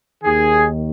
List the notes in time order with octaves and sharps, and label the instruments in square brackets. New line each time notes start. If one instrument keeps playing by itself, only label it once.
[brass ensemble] D#2 D#3 G#4